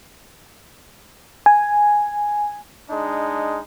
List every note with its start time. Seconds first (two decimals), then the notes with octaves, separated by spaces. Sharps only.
1.46 G#5
2.90 G#3 D4 D#4